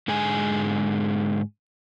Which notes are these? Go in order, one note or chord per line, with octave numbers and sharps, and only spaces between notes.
G#2 D3 G#3 G#4 G#5